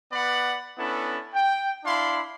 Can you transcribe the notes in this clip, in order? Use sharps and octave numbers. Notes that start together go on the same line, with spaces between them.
B3 B4 D5 F#5 B5
B3 C#4 D4 E4 A4
G5
D4 E4 F5 B5 C6